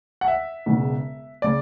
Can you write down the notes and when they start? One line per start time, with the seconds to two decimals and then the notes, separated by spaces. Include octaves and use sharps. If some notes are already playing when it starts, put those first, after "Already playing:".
0.21 F#5
0.28 E5
0.66 E1 E2 C#3
1.42 C#3 D5